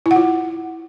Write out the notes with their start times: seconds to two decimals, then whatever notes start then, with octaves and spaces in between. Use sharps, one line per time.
0.06 E4
0.11 F#5
0.16 F4